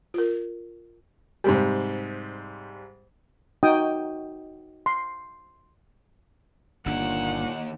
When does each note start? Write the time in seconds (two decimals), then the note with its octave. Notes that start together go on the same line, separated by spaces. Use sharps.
0.14 F4 A#4
1.44 G#2 C3 G3
3.63 D#4 F#4 G5 D#6
4.86 C6
6.86 G1 D#2 A#2 A#3 D4 F#5